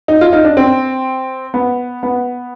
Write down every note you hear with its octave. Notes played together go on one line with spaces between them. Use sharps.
D#4
F4
D#4
D4
C4
B3
B3